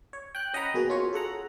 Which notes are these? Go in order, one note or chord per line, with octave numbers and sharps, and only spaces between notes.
C#5
G5 F#6
C#4 D#5 F#5 G5 A#5 B5
B2 A#3 F#4 G#4
C#4 F4 F#4 C#5
G#4 A4 F#5 A#5